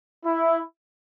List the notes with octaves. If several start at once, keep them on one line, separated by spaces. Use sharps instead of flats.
E4